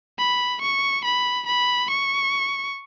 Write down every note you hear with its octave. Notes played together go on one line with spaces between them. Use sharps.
B5
C#6
B5
B5
C#6